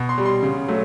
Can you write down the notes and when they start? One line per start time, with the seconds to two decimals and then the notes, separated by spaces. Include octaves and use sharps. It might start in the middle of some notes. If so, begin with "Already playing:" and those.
Already playing: B2
0.09 C6
0.18 G3
0.26 C6
0.43 C#3
0.68 F#3 A3